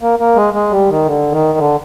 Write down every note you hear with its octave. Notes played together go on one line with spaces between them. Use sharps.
A#3
A#3
G#3
G#3
G3
D#3
D3
D#3
D3